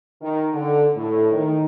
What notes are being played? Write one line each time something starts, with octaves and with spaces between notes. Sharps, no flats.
D#3
D3
A2
D#3